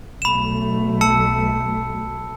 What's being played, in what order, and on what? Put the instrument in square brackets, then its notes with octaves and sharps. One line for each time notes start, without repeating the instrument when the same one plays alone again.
[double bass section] B1 A3 [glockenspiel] B5 E7
[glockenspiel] A5 E6 C#7